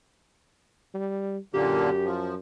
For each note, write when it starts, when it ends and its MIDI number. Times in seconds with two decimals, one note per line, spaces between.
0.94 1.38 55
1.54 2.38 42
1.54 1.90 46
1.54 1.90 50
1.54 1.90 58
1.54 2.09 67
2.05 2.35 53